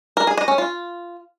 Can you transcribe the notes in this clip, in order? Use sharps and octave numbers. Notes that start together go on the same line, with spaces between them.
A#4
G#4
D#5
C#4
F4